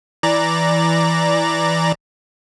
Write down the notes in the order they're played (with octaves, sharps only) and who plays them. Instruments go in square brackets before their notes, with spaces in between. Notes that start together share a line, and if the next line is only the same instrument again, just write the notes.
[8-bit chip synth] E3 D5 A#5